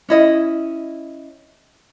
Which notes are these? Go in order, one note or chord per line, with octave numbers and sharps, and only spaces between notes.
C#4 E4 D#5